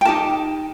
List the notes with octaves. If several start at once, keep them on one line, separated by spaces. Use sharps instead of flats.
G5
D#4 G4 A#4 A5